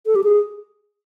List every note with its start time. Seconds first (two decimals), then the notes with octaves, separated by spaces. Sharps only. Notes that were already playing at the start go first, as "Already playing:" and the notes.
0.06 A4
0.15 G4
0.24 G#4